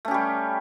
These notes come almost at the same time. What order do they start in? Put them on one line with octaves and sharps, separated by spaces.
A3 C#4 G4 G3